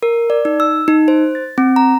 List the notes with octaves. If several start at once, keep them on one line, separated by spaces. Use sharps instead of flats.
A#4
D5
D#4
E6
D#4
C5
A6
C4
A#5